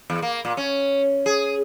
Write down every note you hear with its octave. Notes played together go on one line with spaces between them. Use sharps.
E2
A#3
A#2
C#4
G#4